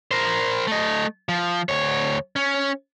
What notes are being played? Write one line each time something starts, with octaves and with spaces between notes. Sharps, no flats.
A#4 C5
A3 D#5
F3
D2 C#5
C#4